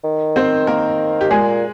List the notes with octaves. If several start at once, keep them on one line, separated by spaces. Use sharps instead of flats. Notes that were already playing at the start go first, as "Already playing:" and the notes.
D#3
C4 C5
A#3 A#4
G4
A#2 G#3 G#4